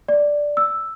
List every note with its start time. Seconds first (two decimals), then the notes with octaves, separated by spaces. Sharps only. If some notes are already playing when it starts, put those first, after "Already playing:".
0.08 D5
0.57 E6